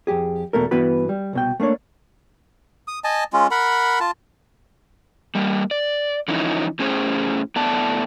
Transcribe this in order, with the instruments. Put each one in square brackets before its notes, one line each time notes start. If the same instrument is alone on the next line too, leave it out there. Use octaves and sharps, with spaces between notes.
[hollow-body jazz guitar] F2 A#2 G4 G#4
E2 B2 A3 A#4
G2 E3 B3 F#4 B4 B5
G3
C2 B2 G5
A3 A#3 D4 C#5
[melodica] D#6
D#5 G#5 A5
G#3 C#4 F4
A#4 F#5 B5
F4 A5
[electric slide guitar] G3 A#3
D5
D3 E3 F3 C#4 D#4 E4
A2 C#4 G#4 C5
A2 A3 B3 D5 A5